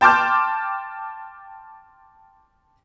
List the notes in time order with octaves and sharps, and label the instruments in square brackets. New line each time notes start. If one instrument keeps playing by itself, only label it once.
[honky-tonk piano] G5 A5 C6 D6 F6 G6